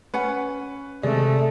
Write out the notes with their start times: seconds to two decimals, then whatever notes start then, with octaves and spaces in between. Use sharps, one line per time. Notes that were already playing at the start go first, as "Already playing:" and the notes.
0.14 C#4 B4 F#5 G#5
1.03 C3 G#3 A3 G#4 D5